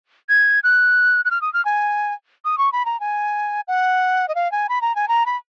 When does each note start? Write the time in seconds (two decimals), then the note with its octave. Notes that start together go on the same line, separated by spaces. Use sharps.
0.29 G#6
0.63 F#6
1.25 F#6
1.31 F6
1.42 D#6
1.54 F6
1.65 G#5
2.45 D#6
2.58 C#6
2.72 B5
2.85 A#5
3.00 G#5
3.68 F#5
4.28 D#5
4.35 F5
4.52 G#5
4.69 B5
4.81 A#5
4.95 G#5
5.08 A#5
5.26 B5